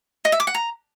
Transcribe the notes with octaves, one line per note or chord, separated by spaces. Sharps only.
D#5
E5
D6
F#5
A#5